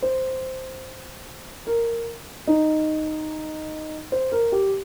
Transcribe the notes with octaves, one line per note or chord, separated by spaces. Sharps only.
C5
A#4
D#4
C5
A#4
G4